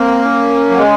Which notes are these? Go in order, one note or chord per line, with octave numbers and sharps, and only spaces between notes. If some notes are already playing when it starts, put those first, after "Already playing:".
Already playing: A#3 C4
C#4
F#3
G#3